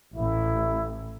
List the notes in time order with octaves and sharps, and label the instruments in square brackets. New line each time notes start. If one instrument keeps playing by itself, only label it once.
[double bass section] A1 [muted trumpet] E4